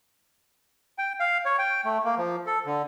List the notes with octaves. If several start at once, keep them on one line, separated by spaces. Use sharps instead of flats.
G5
F5
C#5
G5
A3
A#3
F3
A4
D3